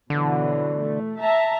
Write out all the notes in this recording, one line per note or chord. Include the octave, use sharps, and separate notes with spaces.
B2 D3 E3 F#3
A3
E5 A5 A#5